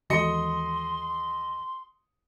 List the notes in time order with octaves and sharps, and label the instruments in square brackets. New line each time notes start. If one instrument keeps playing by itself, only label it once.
[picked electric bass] D#2 E3 G#3 [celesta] F#4 A4 [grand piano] D#5 C#7 [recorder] C6